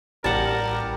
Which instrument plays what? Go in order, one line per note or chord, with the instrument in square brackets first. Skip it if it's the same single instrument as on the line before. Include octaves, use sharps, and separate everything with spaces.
[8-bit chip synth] A1 [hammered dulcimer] G3 [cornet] A#4 [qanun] F#5 A5